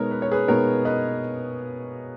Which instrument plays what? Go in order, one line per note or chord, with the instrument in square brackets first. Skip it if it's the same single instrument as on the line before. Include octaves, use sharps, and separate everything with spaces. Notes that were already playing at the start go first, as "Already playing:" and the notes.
Already playing: [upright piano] B2 G#3 B3 D#4 A#4 C#5
B4
C#5
G#4 B4
B2 G#3 B3 D#4 A#4 C#5
B4 D#5